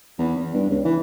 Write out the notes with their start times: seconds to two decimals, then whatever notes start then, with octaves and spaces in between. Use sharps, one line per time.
0.19 E2
0.36 E2
0.54 G2
0.69 C#2
0.85 E3